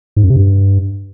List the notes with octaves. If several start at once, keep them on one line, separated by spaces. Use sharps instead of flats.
G#2
F#2
C3
G2